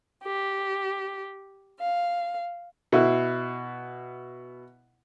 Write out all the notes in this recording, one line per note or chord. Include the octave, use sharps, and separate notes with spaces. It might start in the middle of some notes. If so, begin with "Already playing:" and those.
G4
F5
B2 E4